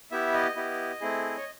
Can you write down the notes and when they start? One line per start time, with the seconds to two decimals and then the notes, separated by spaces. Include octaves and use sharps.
0.11 B3 E4 G4 E5
0.34 D#5
0.56 B3 E4 G4
1.01 A3 C4 E4 G#4
1.37 C#5